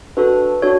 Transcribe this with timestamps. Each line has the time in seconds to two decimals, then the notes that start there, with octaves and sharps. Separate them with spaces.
0.17 D4 F#4 A4 B4
0.62 D4 F#4 A4 C#5